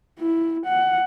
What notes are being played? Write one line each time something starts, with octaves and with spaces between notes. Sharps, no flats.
E4
F#5